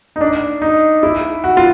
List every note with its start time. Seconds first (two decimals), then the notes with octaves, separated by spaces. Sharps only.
0.16 D#4
0.21 D4
0.62 D#4
1.03 E4
1.44 F#4
1.57 F4